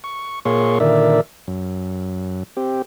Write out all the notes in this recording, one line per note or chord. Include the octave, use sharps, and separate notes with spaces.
C#6
A#2 A#3 G#4 C#5 C6 C#6
A#2 D3 D#3 A#4 D5 E5
F#2
C4 G4